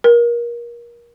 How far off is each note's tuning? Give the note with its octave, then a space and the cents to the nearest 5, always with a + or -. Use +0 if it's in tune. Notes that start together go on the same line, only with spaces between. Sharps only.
A#4 +25